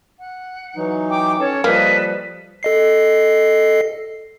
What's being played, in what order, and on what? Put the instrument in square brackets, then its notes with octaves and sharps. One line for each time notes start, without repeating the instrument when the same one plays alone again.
[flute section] F#5
[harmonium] E3 F#3 D#4
[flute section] G5 D6
[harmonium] C#4 [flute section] A4 C#5
[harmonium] F3 G3 [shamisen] A#3 [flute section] A4 B4 D#5
[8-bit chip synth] A4 D#5 C7